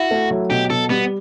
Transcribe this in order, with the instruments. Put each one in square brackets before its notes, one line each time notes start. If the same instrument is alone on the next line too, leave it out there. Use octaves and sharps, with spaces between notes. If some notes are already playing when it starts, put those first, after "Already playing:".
Already playing: [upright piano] E4 [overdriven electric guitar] F#4
[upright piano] A3
F#3
[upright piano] B2 [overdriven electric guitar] G4
[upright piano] B2 [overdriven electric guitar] A4
[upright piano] G3 [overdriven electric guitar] B3